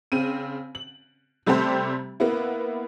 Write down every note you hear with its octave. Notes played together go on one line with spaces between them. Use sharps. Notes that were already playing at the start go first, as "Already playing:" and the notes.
C#3 C4 D#7
F#7
C3 G3 A3 C4 G4 C5
A#3 B3 E4